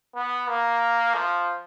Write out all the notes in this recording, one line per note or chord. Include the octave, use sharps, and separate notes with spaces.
B3
A#3
F3